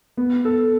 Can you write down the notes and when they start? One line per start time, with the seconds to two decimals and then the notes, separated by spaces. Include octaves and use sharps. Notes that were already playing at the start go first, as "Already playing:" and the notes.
0.17 B3
0.45 A4